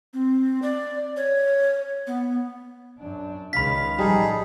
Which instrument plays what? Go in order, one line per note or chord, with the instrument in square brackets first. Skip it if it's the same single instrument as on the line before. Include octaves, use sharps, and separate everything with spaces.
[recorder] C4
D5
C#5
B3
[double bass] F#2 D4
[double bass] C#2 D#3 [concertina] F5 [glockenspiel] B5 B6
[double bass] A1 F3 [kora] G3 A4 [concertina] D#4 G#4